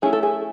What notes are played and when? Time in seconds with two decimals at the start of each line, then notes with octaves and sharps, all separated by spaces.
0.02 A3 C#4 E4 G#4
0.13 A4
0.23 G#4